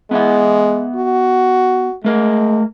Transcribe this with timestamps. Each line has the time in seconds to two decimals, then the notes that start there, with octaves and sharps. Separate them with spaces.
0.11 G#3 B3 E5 F#5
0.96 F#4
2.04 G#3 A3 A#4